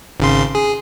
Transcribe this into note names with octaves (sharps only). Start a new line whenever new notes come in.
G#1 C#3 C6
G#4